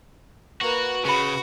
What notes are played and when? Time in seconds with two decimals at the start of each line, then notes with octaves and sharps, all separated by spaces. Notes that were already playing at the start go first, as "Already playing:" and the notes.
0.61 A#3 F#4 B4
1.05 C#3 F#4 B5 C#6